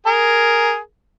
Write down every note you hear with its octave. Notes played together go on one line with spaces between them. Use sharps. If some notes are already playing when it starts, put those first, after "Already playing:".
G#4 A#4